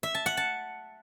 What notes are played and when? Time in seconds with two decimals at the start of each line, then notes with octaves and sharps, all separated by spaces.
0.03 E5
0.15 A5
0.26 F#5
0.37 A5